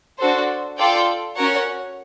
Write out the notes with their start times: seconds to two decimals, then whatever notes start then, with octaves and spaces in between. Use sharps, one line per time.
0.18 D4 F#4 A4 C5
0.77 F4 A4 D5 G5
1.36 C#4 F#4 A#4 C#5 F#5